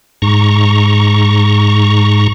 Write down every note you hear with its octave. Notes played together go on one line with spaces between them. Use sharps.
G#2 A#5 C#6